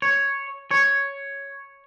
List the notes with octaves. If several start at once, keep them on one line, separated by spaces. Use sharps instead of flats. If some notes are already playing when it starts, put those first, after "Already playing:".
C#5
C#5